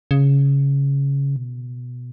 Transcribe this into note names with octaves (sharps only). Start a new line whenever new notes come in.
C#3
B2